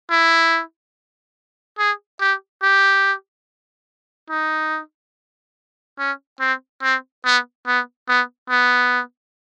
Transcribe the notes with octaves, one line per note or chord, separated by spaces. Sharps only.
E4
G#4
G4
G4
D#4
C#4
C4
C4
B3
B3
B3
B3